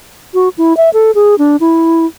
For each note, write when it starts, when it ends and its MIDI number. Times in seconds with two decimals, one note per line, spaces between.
0.34 0.49 66
0.58 0.76 64
0.77 0.90 76
0.94 1.11 69
1.15 1.38 68
1.38 1.57 62
1.60 2.06 64